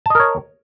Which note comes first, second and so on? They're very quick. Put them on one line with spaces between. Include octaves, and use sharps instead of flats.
A5 D#5 A#4 C#5